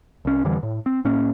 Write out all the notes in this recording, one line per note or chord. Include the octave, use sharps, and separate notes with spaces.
C2 C#4
F2 D3 E3 G3
A2
C4
A2 A#3 C#4